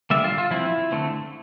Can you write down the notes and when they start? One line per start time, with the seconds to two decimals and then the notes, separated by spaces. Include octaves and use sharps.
0.10 D3 G3 A#3 E5
0.24 F4
0.38 F4
0.51 F3 C4 E4
0.92 D3 A3 C4